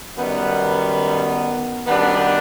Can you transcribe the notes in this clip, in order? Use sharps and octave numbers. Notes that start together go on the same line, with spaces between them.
F#2 D#3 G3 B3
F#2 D#3 G3 B3 D4